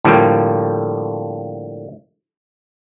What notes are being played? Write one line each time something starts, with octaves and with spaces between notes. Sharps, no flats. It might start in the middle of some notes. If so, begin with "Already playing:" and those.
A2 D3 F3 G3 A#3